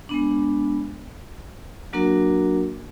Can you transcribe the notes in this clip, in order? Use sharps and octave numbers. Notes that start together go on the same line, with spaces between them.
G#3 B3 D4
F#3 A#3 D4 F#4 A#4